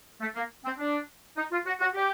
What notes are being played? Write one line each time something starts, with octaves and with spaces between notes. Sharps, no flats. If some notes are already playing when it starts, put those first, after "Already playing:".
A3
A#3
C4
D4
D#4
F4
F#4
F#4
G4